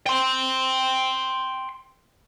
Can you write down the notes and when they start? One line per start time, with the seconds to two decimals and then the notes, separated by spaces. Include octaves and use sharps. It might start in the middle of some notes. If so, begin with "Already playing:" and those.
0.07 G5 C6